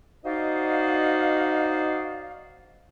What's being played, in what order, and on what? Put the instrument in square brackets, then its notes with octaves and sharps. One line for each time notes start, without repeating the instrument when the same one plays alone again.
[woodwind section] D#4 F#4 C5 D5 D#5 F5